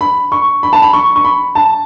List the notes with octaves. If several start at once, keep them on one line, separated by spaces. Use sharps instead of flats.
B5
C#6
B5
A5
B5
C#6
C#6
B5
A5